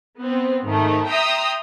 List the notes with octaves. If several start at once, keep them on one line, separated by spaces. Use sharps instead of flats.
B3 C4
G#2 D#3 A3
E5 G5 A#5 C6 D#6 E6